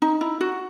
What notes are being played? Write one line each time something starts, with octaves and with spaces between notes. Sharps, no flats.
D#4
E4
F#4